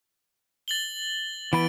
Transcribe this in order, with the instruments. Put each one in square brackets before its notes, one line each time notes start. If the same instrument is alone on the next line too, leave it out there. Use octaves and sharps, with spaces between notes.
[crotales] A6 F#7 G7
[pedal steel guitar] E3 B3 B5 [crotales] D7